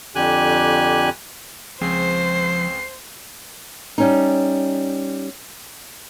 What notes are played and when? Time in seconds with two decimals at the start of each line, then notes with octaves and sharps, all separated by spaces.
0.15 F2 D3 G4 G#5 F#6
1.81 C#2 F3 C4 G#4 C5 C7
3.98 G3 C#4 D#4